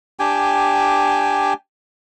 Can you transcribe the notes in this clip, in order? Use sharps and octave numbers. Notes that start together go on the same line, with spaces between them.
D4 G4 G5 G#5